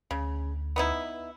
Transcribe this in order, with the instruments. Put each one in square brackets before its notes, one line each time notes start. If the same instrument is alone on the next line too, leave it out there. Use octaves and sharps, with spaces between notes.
[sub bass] D2 [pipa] C#3
[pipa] B3 D#4 E4